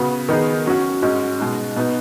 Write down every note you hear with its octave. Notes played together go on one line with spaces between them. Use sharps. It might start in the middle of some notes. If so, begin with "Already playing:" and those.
Already playing: C#3 B3 F#4 B4
D#3 B3 D#4 G#4
F#3 C#4 F#4
G#2 G#3 C#4 F#4
B2 G#3 D#4
B2 B3 D#4